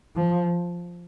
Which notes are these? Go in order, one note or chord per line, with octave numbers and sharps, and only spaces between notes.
F3